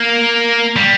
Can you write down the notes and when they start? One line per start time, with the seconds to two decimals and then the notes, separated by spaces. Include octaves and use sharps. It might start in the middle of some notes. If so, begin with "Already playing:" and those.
Already playing: A#3
0.76 G3